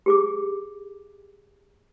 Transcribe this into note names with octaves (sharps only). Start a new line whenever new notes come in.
G4 G#4 D6